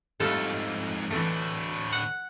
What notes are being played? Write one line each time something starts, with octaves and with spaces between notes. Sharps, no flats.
F2 G#2 G3 A3 F4 A4
D2 A2 E3 A3
F#5